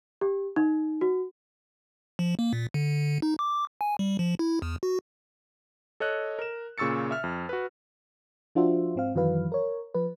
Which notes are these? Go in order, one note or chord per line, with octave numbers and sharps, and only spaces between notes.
G4
D#4
F#4
F3
A#3
A#2
D3
D#4
D6
G#5
G3
F3
E4
E2
F#4
A4 C#5 D#5 F#6
A#4 E7
A#2 C#3 C#6 E6 A6 C#7
E5 F6
F2
F#4 B4
F3 D4 F4 F#4 C5 E5
G#2 C4 F5
F#2 D#3 E3 F#3 B4 F5
A#4 C#5
F3 B4